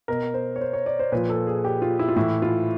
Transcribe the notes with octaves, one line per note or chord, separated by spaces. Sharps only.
B2 A#4
C5
C#5
C5
C#5
D5
C5
A#2 F3 B4
A4
G#4
G4
F4
E4
F4
A2 E3 E4
F4